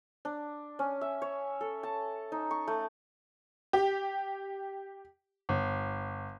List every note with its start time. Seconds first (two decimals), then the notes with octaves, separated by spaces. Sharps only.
0.25 D4
0.79 C#4
1.01 E5
1.22 C#5
1.61 A4
1.83 A5
2.32 D#4
2.51 C#6
2.68 A3
3.73 G4
5.49 G1